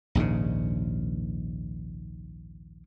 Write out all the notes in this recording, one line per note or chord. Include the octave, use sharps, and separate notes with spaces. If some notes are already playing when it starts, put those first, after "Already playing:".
A#1 D#2 G#2 C#3